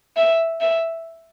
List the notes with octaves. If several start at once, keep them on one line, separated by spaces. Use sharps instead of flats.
E5
E5